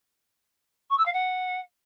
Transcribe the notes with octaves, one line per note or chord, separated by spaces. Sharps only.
C#6
E6
F5
F#5